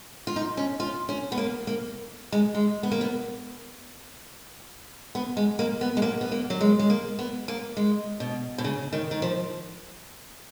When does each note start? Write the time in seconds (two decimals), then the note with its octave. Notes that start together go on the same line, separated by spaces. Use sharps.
0.27 F4
0.36 D#4
0.57 C#4
0.80 F4
1.09 C#4
1.32 B3
1.37 A#3
1.67 A#3
2.32 G#3
2.54 G#3
2.83 B3
2.91 A#3
3.01 B3
5.15 B3
5.37 G#3
5.59 A#3
5.81 B3
5.97 G#3
6.02 A#3
6.21 B3
6.32 A#3
6.50 F#3
6.61 G#3
6.79 G#3
6.90 A#3
7.19 B3
7.48 A#3
7.77 G#3
8.20 B2
8.58 B2
8.64 C#3
8.93 D#3
9.11 D#3
9.22 F3